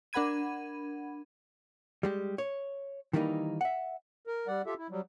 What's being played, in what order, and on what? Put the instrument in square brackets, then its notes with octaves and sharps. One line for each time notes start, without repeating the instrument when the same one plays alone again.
[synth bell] D4 A#4 F#5 B5 G#6 D#7
[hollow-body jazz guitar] G3 G#3 G4
C#5
D#3 E3 G3 A#3 C#4 D#4
E5 F#5
[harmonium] A#4
G3 D5 F#5
F4 G4 A4 E5
E4
F#3 G3